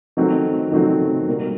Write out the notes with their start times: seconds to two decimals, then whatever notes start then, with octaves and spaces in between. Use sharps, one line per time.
0.17 D#3 F#3 A3 C4
0.72 D#3 F#3 A3 C4
1.27 B2 G3 A#3